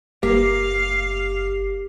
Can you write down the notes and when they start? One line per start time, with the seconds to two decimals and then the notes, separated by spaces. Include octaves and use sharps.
0.23 F#1 A#3 G4 F5